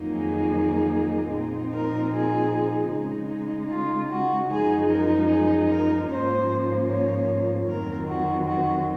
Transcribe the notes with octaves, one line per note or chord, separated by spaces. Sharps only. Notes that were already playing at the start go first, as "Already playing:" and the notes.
Already playing: F2 D#3 F#3 A#3 D#4
G#4
A#2 F3 C4 D#4
A#4
G#4
C#3 G#3 D#4
F4
F#4
F#2 F3 G#3 D#4 G#4
A#4
G#4
A#4
G#2 F3 A#3 C#4 C5
C#5
F2 D#3 F#3 C4 A#4
F#4
F#4